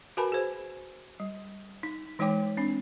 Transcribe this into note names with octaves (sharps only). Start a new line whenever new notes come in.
F#4 A#4 B4 G#5 A5 B5
G#4 C5
G3
D#4
E3 G#3 D#4 C#5 G5 D6
C4 D4